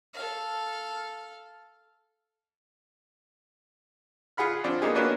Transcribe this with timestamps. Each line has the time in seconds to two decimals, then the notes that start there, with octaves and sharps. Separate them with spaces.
0.14 A4 F5
4.37 F4 G#4 F#5 B5 F6
4.64 F3 C4 D4
4.82 A#3 B3 D#4 G4 G#4
4.95 A#3 B3 C#4 D4 F#4 B4